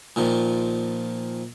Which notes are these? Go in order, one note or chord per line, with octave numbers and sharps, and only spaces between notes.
A#2 D#3 F3